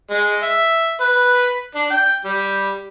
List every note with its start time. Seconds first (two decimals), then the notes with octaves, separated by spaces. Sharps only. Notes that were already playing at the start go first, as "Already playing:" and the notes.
0.10 G#3
0.43 E5
1.01 B4
1.75 D4
1.90 G5
2.25 G3